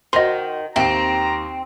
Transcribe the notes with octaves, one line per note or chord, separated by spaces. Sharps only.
D#3 F#4 C5 D#5 C6
D#2 C4 E5 A#5 D7